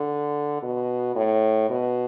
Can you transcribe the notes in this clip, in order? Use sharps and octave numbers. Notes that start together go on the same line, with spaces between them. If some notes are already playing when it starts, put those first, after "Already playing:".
Already playing: D3
B2
A2
B2